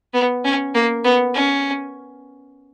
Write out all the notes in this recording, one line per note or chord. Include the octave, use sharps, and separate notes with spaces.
B3
C#4
A#3
B3
C#4